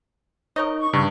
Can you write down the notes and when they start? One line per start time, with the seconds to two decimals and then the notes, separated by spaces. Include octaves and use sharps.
0.56 D#4 A#4 C#5 D#5
0.80 C#6
0.93 G2 C#3